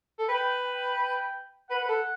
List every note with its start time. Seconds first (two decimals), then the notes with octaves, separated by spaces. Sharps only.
0.19 A4
0.28 B4 G5
0.64 G5
1.70 B4 F#5
1.83 B4
1.89 A4